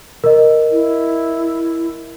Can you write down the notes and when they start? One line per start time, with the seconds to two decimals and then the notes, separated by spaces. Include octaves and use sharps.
0.24 A#4 D#5
0.71 E4